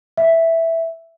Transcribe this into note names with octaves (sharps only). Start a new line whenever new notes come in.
E5